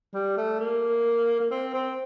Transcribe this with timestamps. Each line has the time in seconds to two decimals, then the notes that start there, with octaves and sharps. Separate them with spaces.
0.14 G3
0.37 A3
0.60 A#3
1.40 A#3
1.51 C4
1.74 C4